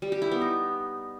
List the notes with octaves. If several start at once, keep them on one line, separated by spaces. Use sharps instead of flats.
G3
G4
E4
B3
D#4